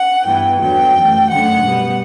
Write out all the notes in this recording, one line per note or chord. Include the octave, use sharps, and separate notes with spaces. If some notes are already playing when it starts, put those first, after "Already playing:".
Already playing: F#5
G2 E3 B3 G5
E2 D3 F#3 B3 G5
F#2 E3 A3
F#2 D3 A3 F#5
B2 G3 B3